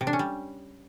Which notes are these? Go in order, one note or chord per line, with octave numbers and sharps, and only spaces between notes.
C3
D4
C#4
G3